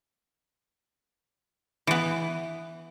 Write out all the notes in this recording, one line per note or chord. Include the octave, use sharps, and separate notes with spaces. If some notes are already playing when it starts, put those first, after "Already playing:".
E3 B3